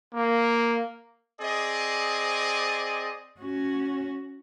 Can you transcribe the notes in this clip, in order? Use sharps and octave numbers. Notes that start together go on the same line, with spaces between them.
A#3
C4 G#4 D5 D#5
C#4 F#4